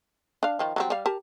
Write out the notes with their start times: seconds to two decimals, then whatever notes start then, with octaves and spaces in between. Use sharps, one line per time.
0.43 D4 F5
0.59 D#3 F3
0.76 F#3 G3 C4
0.90 G3 F5
1.06 G4 A#4 A5